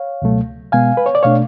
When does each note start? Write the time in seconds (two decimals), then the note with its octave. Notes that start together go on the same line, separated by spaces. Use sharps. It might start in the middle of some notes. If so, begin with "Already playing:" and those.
Already playing: C#5 F5
0.22 C#2 B2 F#3 A3
0.72 B2 G#3 B3 F5 G#5
0.97 B4
1.06 C#5
1.15 D5
1.23 B2 A3 D4 C#5 F5